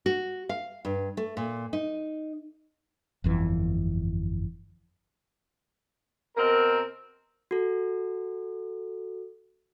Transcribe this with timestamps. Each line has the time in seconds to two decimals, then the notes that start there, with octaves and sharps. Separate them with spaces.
0.06 F#4
0.49 F5
0.85 G2
1.17 A3
1.37 A#2
1.73 D#4
3.24 G1 F2 E3
6.37 B2 C4 A#4
7.51 F#4 A4